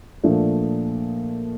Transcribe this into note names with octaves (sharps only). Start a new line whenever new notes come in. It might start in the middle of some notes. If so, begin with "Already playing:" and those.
A#2 F3 A3 D4